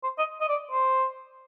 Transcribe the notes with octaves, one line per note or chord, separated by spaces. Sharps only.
C5
D#5
D#5
D5
C5